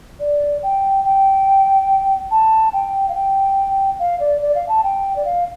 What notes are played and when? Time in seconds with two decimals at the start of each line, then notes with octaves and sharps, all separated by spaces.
0.20 D5
0.63 G5
1.04 G5
2.31 A5
2.73 G5
3.09 F5
3.14 G5
3.99 F5
4.20 D5
4.42 D5
4.55 F5
4.69 A5
4.83 G5
5.16 D5
5.25 F5